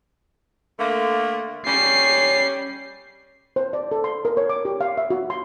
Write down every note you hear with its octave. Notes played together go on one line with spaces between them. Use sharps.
D3 A3 A#3
G3 C#4 C7
C5
D5
A4
C6
A#4
C#5
D6
G4
F5
E5
F#4
C6